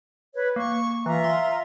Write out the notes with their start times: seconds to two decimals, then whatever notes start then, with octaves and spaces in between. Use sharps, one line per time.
0.35 B4 C#5
0.56 A#3 C#6
1.06 E3 F4 E5 A#5
1.24 C6